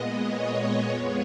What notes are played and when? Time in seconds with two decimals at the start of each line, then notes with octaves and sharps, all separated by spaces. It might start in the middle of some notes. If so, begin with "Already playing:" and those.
Already playing: A#2 G#3 B3 D#5
0.20 C#5
0.88 F2 F3 G#3 B3